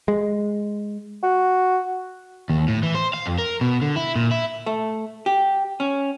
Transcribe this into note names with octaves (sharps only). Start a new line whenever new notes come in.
G#3
F#4
D#2
A2
E3
C5
F5
F2
A#4
B2
D3
E4
A#2
E4
A3
G4
C#4